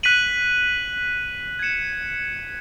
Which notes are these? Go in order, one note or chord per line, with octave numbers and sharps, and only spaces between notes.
F#6 B6 D#7 F#7
G#6 C#7 E7